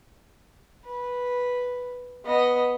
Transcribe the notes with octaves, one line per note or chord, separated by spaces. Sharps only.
B4
B3 D#5